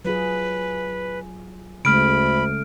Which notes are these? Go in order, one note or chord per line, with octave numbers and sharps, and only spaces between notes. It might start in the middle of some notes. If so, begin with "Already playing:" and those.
F#3 F4 G#4 B4
D2 C#3 G#3 A3 B5 F6 D7